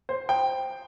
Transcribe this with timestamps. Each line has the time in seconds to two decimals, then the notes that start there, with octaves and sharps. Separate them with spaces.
0.09 C5
0.29 G5